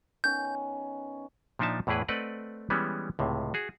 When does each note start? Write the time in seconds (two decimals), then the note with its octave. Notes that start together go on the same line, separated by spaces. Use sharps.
0.24 D#3 B3 C#4 G6
1.59 A#2 F3 D4 D#4 E5 A5
1.87 E2 A2 E3 E4 G#4 B4
2.08 A3 C4 B4 D5 D#5 F#5
2.70 E3 G3 G#3 B3 C#4
3.19 C#2 A2 C3
3.54 F#4 G#4